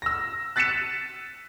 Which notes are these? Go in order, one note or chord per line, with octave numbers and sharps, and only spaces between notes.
E6 A#6
F#6 A6 B6 C#7 D#7 E7